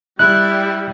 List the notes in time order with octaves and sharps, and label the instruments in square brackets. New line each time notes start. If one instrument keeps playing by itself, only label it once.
[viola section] G3 [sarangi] E4 [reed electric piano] F#6